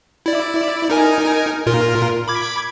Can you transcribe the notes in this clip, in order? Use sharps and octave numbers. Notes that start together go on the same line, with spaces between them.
E4 D5
D#4 A#4 G#5
A#2 F4 A#4
B5 D6 G#6